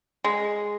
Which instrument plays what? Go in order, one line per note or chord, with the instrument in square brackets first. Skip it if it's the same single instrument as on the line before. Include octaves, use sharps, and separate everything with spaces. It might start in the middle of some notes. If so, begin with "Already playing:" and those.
[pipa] G#3